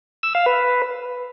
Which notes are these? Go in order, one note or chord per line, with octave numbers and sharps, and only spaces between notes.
E6
F5
B4